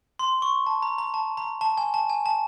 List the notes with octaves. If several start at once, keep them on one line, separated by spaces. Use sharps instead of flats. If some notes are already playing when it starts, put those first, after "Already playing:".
C6
C#6
A5
A#5
A#5
A5
A#5
A5
G#5
A5
G#5
A5